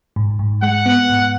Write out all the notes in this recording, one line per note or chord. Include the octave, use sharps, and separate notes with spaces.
G#2
G#2
G#3 F#5
B3
G#2